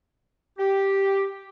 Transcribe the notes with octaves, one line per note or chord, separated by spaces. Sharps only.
G4